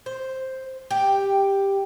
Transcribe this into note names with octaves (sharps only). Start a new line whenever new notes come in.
C5
G4